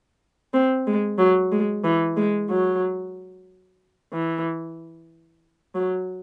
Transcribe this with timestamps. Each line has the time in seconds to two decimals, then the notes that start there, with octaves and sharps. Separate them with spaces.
0.54 C4
0.86 G#3
1.19 F#3
1.52 G#3
1.84 E3
2.17 G#3
2.49 F#3
4.12 E3
5.75 F#3